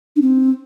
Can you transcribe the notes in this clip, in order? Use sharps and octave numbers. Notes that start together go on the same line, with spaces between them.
D4
C4